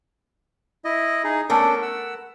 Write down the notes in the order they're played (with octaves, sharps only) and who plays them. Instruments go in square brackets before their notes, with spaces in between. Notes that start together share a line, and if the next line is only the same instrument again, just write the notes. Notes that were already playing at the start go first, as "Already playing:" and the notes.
[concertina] E4 D#5
D#4 G#4
[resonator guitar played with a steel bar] A3 B3 A#4 [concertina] C#4 D4 A4
[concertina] F#5 E6